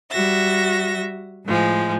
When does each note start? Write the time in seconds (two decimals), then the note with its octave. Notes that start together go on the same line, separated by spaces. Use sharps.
0.10 G3 F#4 E5 A#6
1.45 A2 F3 G#3